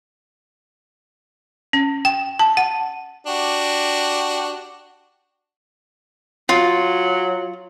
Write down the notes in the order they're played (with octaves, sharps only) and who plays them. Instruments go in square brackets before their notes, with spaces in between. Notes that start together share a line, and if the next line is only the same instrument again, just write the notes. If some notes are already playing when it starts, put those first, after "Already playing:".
[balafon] C#4
G5
A5
F#5
[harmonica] D4 F#4 G4
[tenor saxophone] F#3 [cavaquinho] F4